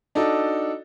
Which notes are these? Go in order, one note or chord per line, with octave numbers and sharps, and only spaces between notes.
D4 D#4 F#4 A4